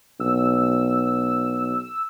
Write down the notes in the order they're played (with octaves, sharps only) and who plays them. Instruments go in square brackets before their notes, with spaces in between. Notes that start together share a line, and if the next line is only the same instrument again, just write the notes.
[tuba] B1 [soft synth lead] E6